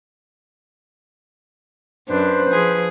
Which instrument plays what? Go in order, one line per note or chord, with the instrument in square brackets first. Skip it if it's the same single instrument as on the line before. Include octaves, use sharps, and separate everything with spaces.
[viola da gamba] F#2 D4 [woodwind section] B4 C5
[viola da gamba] F3 G#4